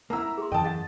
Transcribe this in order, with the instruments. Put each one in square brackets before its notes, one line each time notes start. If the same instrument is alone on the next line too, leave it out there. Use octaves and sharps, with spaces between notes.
[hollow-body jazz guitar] A#3 E4 [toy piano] A#4 F#5 [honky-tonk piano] A#5 E6
[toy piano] G#4 A4 C6
[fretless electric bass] F#2 E3 [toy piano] A#4 [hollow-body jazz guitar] D#5 [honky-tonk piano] G5 A5
[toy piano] G#4 F#5 A5 [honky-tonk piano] A6